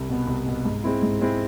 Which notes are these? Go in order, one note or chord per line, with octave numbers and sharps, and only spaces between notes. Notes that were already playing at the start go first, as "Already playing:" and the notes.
Already playing: C2
B2 B3
C2
B2 B3
G#2
G#3 C4 E4
G#2
G#3 C4 E4